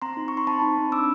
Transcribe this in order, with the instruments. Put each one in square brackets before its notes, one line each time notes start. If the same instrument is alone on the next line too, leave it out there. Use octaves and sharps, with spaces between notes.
[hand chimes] C4 A#5 C6
D#4
D#4 C#6
C6
C4 A5 B5
D#4
C4
D4 D6 E6